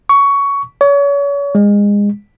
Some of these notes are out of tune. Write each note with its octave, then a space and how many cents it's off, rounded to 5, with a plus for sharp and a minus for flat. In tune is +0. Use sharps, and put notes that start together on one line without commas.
C#6 +15
C#5 +35
G#3 -25